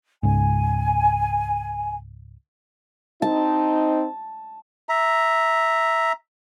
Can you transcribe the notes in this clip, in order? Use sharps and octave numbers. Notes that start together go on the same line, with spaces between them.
C#2 G#2 G#5
C4 D#4 A5
E5 A#5